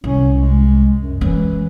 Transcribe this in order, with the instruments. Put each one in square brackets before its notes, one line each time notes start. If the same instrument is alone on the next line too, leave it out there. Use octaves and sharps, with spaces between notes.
[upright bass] C2 [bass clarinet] C#4
[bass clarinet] G#3
F#2
[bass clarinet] E3 [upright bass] G#3 C#4